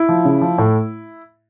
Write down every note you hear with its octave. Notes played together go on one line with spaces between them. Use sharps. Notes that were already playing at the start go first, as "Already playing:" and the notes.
Already playing: E4
F3
C#3
F3
A2